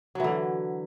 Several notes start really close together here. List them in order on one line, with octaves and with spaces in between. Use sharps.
F#3 E3 D3